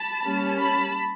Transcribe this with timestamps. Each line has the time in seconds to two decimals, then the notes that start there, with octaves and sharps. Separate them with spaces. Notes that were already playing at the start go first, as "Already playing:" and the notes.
Already playing: A5 B5
0.24 G3 A#3 C#4
0.58 A5 B5